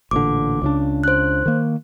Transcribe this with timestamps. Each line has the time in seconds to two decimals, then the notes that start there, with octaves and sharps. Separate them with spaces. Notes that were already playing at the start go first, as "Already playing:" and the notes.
0.11 A1 A#2 D3 D6
0.62 C#2 C#3 D4
1.04 C5 F#6
1.46 D#3 A#3